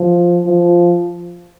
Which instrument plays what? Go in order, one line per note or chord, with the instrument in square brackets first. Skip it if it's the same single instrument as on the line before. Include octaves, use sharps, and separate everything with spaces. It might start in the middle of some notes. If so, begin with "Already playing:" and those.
Already playing: [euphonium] F3
F3